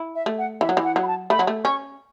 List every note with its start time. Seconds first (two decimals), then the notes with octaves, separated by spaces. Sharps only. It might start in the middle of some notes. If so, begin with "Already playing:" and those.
Already playing: E4
0.15 E5
0.26 A3
0.38 F#5
0.61 E3 E5
0.69 F#3
0.77 E3
0.84 F#5
0.96 F#3
1.03 B5
1.07 A5
1.30 A3 B5
1.39 F#3
1.47 A3
1.65 C#4 C#6